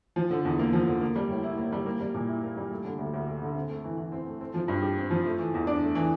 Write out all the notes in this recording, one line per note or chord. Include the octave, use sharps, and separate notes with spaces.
F3
D3
E2
A#3
F3
D3
A#3
G3
A2
E4
A#3
G3
A#3
G3
A#2
E4
A#3
G3
A3
D3
D2
D2
A3
D3
C4
A3
E3
E3
C4
A3
C4
F3
G2
G4
C4
F3
A3
E3
E2
D4
A3
E3